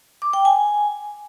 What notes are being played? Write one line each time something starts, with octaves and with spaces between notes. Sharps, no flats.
D6
G5
G#5